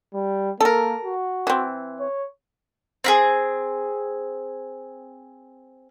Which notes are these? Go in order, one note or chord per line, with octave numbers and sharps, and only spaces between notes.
G3
A#3 A4 A#4
F#4
E3 C4
C#5
C4 E4 G#4